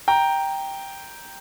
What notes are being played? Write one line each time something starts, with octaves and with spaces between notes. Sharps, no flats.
G5 A#5